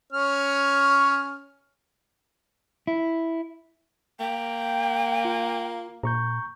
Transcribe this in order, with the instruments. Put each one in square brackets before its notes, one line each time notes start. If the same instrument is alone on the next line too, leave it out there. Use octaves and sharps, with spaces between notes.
[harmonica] C#4 C#5 F6
[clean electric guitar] E4
[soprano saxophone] A#3 [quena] G5
[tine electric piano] F4
[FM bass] A#2 [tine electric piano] A#5 C#6 G6